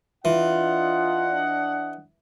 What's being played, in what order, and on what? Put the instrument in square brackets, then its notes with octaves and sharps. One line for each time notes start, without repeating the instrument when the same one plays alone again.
[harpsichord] E3 [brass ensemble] D4 D#5 F#5 [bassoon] F4